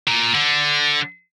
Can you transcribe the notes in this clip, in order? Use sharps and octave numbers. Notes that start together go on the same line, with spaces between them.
A#2
D3